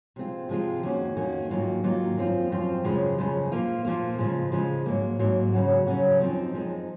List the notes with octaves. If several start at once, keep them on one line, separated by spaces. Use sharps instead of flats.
C3 F3 G#3 C4 F4
C3 F3 G#3 C4 F4
F2 D#3 A#3 C#4 F#4
F2 D#3 A#3 C#4 F#4
G#2 D#3 F#3 A#3 F4
G#2 D#3 F#3 A#3 F4
F#2 F3 C4 F4
F#2 F3 C4 F4
F#2 C#3 F3 G#3
F#2 C#3 F3 G#3
A#2 F3 A#3 F4
A#2 F3 A#3 F4
C#3 F3 G#3
C#3 F3 G#3
G#2 F#3 A#3
G#2 F#3 A#3
F#2 C#3 F#3 C#4 F#4
F#2 C#3 F#3 C#4 F#4
F#2 F3 G#3 C4 D#4
F#2 F3 G#3 C4 D#4